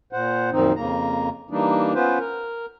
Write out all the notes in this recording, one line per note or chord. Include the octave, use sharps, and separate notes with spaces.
A#2 C5 F#5
F#2 A#2 D#3 F3 C4 D#4
F2 C#3 A#3 A#5
E3 G3 A#3 D4 D#4
B3 C#4 F4 B4 C5
A#4